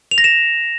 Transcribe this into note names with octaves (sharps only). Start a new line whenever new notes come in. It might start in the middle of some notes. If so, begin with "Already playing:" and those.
F7
A#6
E7